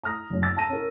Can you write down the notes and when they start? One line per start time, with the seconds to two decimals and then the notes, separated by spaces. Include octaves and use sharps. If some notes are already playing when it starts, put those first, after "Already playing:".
0.03 A#5 D#6 F6 A#6
0.30 F#1 F#2
0.42 D6 E6 A6
0.57 A5 A#5 A#6 D#7
0.69 C#4 A#4